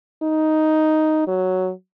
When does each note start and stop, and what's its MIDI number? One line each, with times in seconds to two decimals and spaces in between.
0.23 1.24 63
1.28 1.71 54